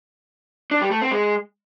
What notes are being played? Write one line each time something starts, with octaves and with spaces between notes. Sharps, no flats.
D4
G3
A3
C4
G#3